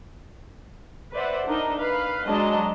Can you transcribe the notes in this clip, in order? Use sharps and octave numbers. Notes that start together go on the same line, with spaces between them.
B4 C5 D5 E5 F#5
D4 D#4 A#4 D#5
B4 F5
F#3 G#3 D4 D#5 A5 A#5